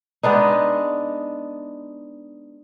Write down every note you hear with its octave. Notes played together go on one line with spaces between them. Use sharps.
G#3 B3 D4 D#4